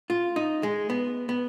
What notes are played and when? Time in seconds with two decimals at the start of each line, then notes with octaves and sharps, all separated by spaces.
0.10 F4
0.36 D#4
0.63 G#3
0.90 B3
1.29 B3